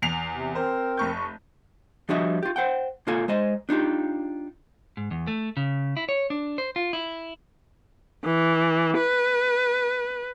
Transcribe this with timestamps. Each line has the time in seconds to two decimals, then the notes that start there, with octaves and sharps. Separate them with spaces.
0.02 E2 C7 F7
0.33 C3
0.55 C4 A#4 C5
0.97 F1 C#6 G6
2.09 F3 G3 D4 F#4 D#5 E5
2.43 F4 G4
2.56 C5 F#5 G5
3.07 A#2 A#3 F4 A4 G#5
3.28 G#3 C5 D#5
3.69 D4 D#4 F4 G4
4.97 G#2
5.11 E2
5.27 A3
5.57 C#3
5.97 E4
6.09 C#5
6.30 D4
6.58 C5
6.76 F4
6.93 E4
8.24 E3
8.97 B4